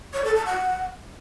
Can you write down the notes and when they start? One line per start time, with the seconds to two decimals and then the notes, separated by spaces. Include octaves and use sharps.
0.14 C#5
0.25 A4
0.35 A5
0.46 F#5